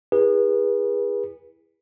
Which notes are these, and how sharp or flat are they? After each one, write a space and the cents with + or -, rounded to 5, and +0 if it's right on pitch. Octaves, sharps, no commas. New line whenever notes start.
E4 +0 G#4 -30 B4 -30